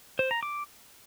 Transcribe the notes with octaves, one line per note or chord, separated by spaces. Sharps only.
C5
A#5
D6